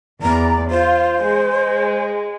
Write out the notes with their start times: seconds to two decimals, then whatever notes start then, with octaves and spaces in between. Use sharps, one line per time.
0.22 E2 D5 A#5
0.71 F4 C5
1.25 G#3